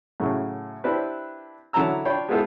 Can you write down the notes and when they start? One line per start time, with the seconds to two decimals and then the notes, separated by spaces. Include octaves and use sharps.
0.20 A2 C#3 F#3
0.84 C4 D4 E4 G4 B4
1.73 D3 F#3 E4 A5 A#5 E6
2.05 D4 F4 C#5 G5 B5
2.29 G#3 B3 E4 F4 A4 C5